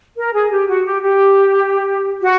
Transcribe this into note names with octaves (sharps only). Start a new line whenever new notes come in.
A#4
G#4
G4
F#4
G4
G4
F#4